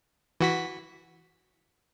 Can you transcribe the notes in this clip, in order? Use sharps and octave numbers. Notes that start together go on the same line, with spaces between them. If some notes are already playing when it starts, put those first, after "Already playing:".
E3 F#4 B6